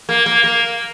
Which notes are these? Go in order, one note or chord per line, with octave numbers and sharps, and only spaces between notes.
A#3
A#3
A#3